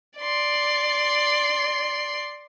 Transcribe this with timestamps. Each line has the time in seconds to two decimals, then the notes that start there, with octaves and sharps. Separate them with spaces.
0.19 D5 C6